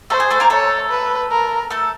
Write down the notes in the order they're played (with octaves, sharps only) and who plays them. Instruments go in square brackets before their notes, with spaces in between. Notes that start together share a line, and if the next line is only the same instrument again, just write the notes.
[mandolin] A3 A4 [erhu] C5
[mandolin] G#4
A3 A4
A#3 A#4
[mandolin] A3 A4 [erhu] C#5
[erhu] B4
A#4
[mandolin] A3 A4